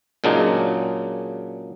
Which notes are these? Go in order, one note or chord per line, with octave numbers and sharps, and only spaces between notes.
A#2 C#3 F#3 G#3 D4 D#4